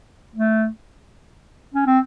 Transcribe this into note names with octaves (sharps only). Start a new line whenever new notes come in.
A3
C#4
C4